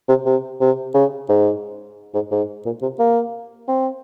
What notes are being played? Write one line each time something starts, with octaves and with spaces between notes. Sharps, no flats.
C3
C3
C3
C#3
G#2
G#2
G#2
A#2
C3
A#3
C4